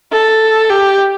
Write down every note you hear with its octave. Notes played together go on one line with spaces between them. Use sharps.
A4
G4